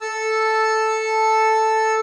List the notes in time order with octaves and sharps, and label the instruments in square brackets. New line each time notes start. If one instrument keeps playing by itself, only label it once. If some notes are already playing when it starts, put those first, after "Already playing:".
[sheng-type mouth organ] A4 A5 E6